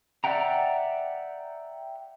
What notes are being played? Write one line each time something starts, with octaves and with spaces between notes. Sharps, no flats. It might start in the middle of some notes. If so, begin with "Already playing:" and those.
D5 E5 F#5 G5 A#5